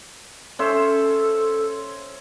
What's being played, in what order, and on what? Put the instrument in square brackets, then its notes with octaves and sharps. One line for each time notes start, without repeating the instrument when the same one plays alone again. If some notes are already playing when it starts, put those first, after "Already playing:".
[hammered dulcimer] C#4 C5 E5 [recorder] A4